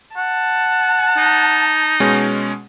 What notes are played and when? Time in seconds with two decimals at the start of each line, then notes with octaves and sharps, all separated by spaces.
0.17 F#5 A5
1.17 D#4
2.00 B2 G#3 C#4